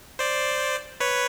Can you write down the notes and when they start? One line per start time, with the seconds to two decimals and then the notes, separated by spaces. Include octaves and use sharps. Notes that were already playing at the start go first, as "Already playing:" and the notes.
0.19 C5 D5
1.00 B4 C#5